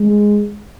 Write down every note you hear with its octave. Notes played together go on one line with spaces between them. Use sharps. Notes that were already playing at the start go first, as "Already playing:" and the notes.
Already playing: G#3